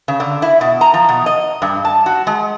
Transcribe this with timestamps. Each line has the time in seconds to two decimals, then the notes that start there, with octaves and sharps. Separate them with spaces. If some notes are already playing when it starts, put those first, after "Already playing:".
0.08 C#3
0.20 D3
0.42 E4
0.61 B2
0.81 A#5
0.94 F3
1.09 B2
1.26 D#5
1.62 G2
1.85 A5
2.06 F#4
2.27 G#3